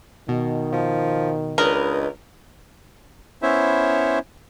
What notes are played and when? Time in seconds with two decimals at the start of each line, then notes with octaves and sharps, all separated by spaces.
0.29 B2 D#3
0.73 B2 F3
1.58 C#2 D4 A#4 B4 D#5
3.42 B3 C#4 E4 C5 C#5 E5